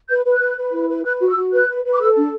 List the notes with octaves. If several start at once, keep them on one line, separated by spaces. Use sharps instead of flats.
B4 G6
B4
F#6
B4
B4
E4
B4
B4 F#6
F#4
E6
F#4
B4 F#6
B4
B4
D6
A4 E6
D4